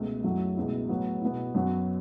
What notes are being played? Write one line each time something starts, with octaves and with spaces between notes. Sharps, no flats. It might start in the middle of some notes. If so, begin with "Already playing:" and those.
Already playing: C#2 B2 A3
F#2 F#3 A3 E4
C#2 B2 A3 E4
A2 F#3 B3
B2 B3 E4
F#2 F#3 B3